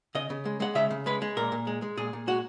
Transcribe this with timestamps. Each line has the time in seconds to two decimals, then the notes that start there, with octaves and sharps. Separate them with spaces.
0.15 C#3 D#5
0.30 C#3
0.45 G#3
0.60 G#3 F#5
0.75 C#3 E5
0.91 C#3
1.06 G#3 B4
1.22 G#3
1.37 A#2 A#4
1.52 A#2
1.67 G#3
1.82 G#3
1.97 A#2 G#4
2.13 A#2
2.27 G#3 F#4